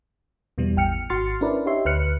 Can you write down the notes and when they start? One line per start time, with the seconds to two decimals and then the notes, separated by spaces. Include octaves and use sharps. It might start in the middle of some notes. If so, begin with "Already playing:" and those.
0.58 E2 B2 E3 G3
0.76 A1 G5 F6 C#7
1.10 G#1 F#4 C6 F6 A6 C#7
1.41 C#4 D4 E4 A#4 B4 D5
1.66 D#4 G4 C#5 E5 C6
1.85 D2 B4 F6 F#6 C#7